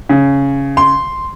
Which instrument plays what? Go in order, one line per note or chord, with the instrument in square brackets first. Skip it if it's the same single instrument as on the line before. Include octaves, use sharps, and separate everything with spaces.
[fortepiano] C#3
[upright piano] C6